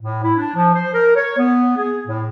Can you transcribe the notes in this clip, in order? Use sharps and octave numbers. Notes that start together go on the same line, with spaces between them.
A2
E4
D4
F3
C5
A#4
C#5
B3
G#4
A2